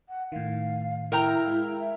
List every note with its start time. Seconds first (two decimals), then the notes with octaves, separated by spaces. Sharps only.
0.09 F#5
0.32 A2 D#3 F5
1.12 E4 A#4 G5 A#5
1.46 G#3 F5
1.79 E5